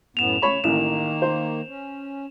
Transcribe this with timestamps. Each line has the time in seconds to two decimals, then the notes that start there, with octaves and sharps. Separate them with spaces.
0.17 F#2 A2 B3 E7 F7
0.42 C#3 C#5 B5 C#6
0.64 A1 D#3 A#3 E7
1.22 C5
1.67 C#4